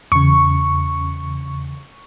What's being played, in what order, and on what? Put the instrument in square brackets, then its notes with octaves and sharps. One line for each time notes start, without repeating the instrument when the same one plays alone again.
[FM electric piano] E2 C#3 [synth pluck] C#6